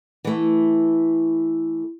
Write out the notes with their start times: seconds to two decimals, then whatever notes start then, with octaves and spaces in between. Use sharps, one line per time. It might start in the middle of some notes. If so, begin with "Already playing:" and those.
0.25 E3 A3